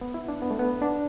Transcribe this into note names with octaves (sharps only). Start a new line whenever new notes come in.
B3
E4
D4
B3
A3
B3
D4